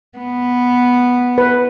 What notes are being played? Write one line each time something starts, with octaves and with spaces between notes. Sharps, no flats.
B3
B4